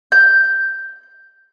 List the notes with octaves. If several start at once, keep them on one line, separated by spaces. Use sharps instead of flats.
G6